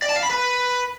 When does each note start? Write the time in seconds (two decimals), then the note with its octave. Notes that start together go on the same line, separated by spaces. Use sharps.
0.02 D5
0.09 A5
0.16 F5
0.23 B5
0.30 B4